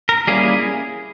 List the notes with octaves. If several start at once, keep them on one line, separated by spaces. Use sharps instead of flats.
A#4
G3 A#3 C#4 E4 G#4